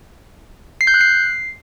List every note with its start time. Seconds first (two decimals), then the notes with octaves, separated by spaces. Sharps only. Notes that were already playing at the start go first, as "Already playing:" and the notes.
0.81 C7
0.87 G6
0.94 F#6
1.01 C7